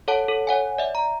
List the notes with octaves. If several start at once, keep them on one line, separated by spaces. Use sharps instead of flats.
A4 C#5 F#5 A5 D7
A4
C#5 F#5 G#5
D5 E5
A#5